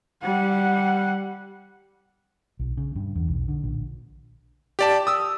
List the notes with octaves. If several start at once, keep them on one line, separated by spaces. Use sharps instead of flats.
G3 F#5
B1
C#3
G2
E2
B1
D3
A#1
G4 D5 A5
D#6 E6